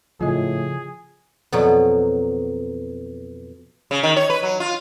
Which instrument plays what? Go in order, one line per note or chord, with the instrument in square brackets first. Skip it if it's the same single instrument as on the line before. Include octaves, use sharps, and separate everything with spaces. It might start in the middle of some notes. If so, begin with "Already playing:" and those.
[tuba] A2 [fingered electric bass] C#3 F3 [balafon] F4 D#5 [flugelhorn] G#4
[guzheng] F2 B2 F#3
[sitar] C#3
D#3
C#5
B4
F#3
F4